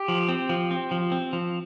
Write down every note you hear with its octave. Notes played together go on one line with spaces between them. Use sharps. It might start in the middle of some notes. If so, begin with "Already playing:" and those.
Already playing: G4
F3
C4
F3
C4
F3
C4
F3